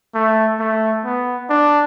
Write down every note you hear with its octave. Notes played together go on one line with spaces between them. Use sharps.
A3
A3
B3
D4